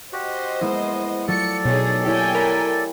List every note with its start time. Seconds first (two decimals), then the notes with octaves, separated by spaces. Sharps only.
0.13 F#4 G4 C5 D#5
0.61 G#3 A#3 B3 E4
1.28 F#3 A3 F4 A4 D5 C#7
1.65 B2 D#4 G#4 C#5
2.04 A#3 E4 G4 C#5 G5 G#5
2.35 A#4 B5